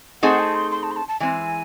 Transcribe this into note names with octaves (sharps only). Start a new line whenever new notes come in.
A3 C4 D#4 G#4 C5 F#5
A5
C6
C6
A5
C6
A5
A5
E3 G#3 C4 G#5